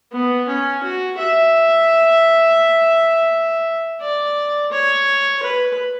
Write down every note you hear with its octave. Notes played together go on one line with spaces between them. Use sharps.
B3
C#4
F#4
E5
D5
C#5
B4